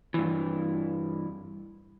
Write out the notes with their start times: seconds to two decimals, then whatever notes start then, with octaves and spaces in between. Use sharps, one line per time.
0.14 G2 E3